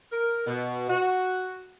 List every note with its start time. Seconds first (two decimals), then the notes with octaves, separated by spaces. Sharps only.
0.12 A#4
0.47 B2
0.89 F#4